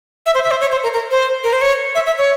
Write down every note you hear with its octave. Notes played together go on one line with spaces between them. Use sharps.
E5
C5
E5
C5
C#5
C5
A#4
A#4
C5
A#4
C5
C#5
E5
E5
C#5